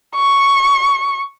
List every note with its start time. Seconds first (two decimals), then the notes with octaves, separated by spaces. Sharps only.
0.16 C#6